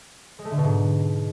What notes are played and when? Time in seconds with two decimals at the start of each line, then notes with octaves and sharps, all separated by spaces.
0.39 G#3
0.45 A3
0.51 D3
0.58 B2
0.64 G#2